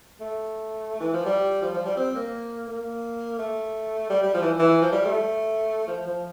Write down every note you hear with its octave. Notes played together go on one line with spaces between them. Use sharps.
A3
E3
F3
G3
F3
F3
G3
C4
A#3
A#3
A3
G3
G3
F3
E3
E3
F3
G3
A3
F3
F3